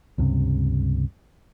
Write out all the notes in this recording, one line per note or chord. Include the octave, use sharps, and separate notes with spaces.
C#2 G2 C3